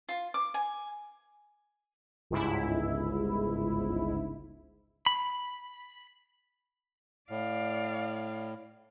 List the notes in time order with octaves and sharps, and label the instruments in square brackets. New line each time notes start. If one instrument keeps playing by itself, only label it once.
[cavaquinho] F4
D6
G#5
[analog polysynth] G1 C#2 G#2 E4
[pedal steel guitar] B5
[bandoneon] A2 [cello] D5 F5